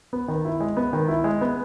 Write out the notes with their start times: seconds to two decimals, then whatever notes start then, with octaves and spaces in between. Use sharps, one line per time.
0.13 B3
0.28 D#3
0.45 E4
0.60 G#3
0.77 B3
0.93 D#3
1.08 E4
1.24 G#3
1.41 B3